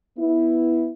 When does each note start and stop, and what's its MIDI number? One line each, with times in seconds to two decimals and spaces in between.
0.18 0.90 59
0.18 0.90 64